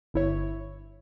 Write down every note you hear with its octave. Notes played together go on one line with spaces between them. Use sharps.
G1 E4 C#5